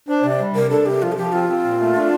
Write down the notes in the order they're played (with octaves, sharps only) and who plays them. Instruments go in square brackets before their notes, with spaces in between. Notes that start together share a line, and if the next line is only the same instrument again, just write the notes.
[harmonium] D4 [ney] C5
[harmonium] C3 [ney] D5
[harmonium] G3
[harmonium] C3 [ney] A#4
[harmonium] D4 [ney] A4
[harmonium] C3 [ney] G4
[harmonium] F3 [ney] F4
[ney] A4
[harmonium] F3 [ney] G4
[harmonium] C4 [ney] F4
[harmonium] C4
A#2
A3
D4